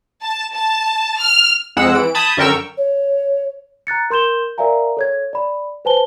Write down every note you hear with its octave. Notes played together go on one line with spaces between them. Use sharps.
A5
A5
F6
F2 G#3 F#5 E6
E3 D7
A5 B5 D#6 G6 G#6
F#2 D3 A#4 G5 C#6 E6
C#5
A#5 F#6 A6 C#7
A#4 C6 G6 E7 G7
A#4 D5 E5 F5 G#5 A#5
A4 C#5 G#6
D5 B5
B4 C5 G#5 A5 G7